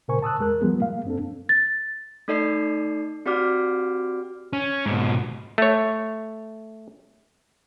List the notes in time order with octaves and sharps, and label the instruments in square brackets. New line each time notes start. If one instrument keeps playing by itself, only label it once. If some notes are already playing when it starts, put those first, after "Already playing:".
[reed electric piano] A#2 C#3 A#4 C5 G#5 C#6
A5 D#6 E6 F#6
E2 G#3 A#4 F#6
F3 G3 G#3 B3 G#4
A#3 F5
F#2 C4 D4 A4
[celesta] A6
[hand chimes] A3 D#4 A4 D5 D#5 C7
C4 F#4 G4 D5 D6 F6
[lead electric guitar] C#4
G#2 B2
[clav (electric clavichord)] A3 C#5